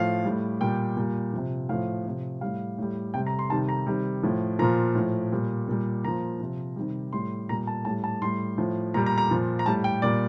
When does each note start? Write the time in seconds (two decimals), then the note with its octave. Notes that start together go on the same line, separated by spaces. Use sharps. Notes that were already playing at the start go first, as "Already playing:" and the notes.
Already playing: A2 F3 F5
0.24 A2 G3
0.61 A#2 G3 G5
0.97 A#2 G3
1.33 C3 F3
1.69 A2 F3 F5
2.05 C3 F3
2.41 A2 G3 F5
2.78 A2 G3
3.14 C3 G3 G5
3.27 A#5
3.39 C6
3.50 C3 D#3 G3 A5
3.69 A#5
3.87 C3 D#3 G3
4.23 A2 F3
4.59 A#2 F3 A#5
4.95 A2 F3
5.32 A#2 G3
5.68 A#2 G3
6.05 A#2 F3 A#5
6.40 C3 F3
6.76 C3 D#3 G3
7.13 A2 G3 C6
7.49 A#2 G3 A#5
7.67 A5
7.85 A2 G3 A5
8.04 A5
8.22 A2 G3 C6
8.58 A2 F3
8.94 A#2 G3 A#5
9.06 A#5
9.18 A#5
9.31 A#2 F3
9.59 A#5
9.66 A2 G3 A5
9.84 G5
10.02 A#2 G3 D5